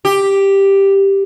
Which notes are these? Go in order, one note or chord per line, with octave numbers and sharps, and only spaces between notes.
G4